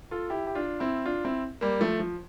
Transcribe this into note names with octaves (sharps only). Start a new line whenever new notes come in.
F4 A4
E4 G4
G4
D4 F4
C4 E4
D4 F4
C4 E4
G3 A#3
F3 A3
F3